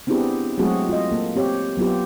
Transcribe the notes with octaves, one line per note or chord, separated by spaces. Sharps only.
B3 C4 D4 E4 G4 G#4
F#3 G#3 A3 C4 F#4 G#4
F4 D#5
A#3 A4
C4 G4 C#5
F#3 B3 F4 G4